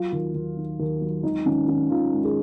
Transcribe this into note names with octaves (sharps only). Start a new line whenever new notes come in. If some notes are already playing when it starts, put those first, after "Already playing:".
Already playing: F#3 F4
D#2
D#2
D#3
D#2
F#3
G#1 D#4
G#1 C#4
D#3 C#4
D#3 F4
G#2
G#4